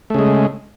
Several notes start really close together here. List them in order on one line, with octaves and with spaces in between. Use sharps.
A3 C#3 G#3